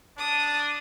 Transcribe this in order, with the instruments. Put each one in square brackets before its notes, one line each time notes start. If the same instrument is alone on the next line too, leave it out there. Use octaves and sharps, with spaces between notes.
[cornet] D4 [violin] D#6